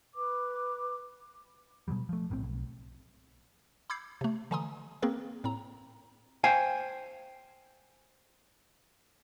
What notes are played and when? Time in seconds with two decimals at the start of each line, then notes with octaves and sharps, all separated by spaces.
0.16 B4 D6
1.88 B2 D3 F#3 G3
2.09 F3 A3
2.30 A#1 A2 D3 C4
2.43 B1
3.90 B5 D6 E6 G6 G#6 C7
4.21 C3 A3
4.51 D3 E3 G#5 A#5 C6 D#6
5.02 A#3 C4 G#4 A#4 B4
5.44 A2 C4 A#5
6.44 C5 F5 G5 G#5